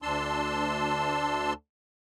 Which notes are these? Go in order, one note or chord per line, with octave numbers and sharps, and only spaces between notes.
D2 D4 A5 C6 E6